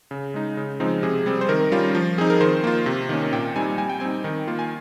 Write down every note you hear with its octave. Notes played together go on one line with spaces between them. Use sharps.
C#3
G#3 D#4
C#3
F3 G#3 C4 D#4
C3 G#4
G3 C4
C5
D#3 A#4
G3 C#4 F4
F3
C4 D#4 G#4
A#4
D#3 C5
A#3 F4
C3
D#3 A#3 C#4
A#2 G5
G3 C4 D#4 G#5
G3 G#5
G5
C4 D#4 G#5
D#3
A#3 F4
G#5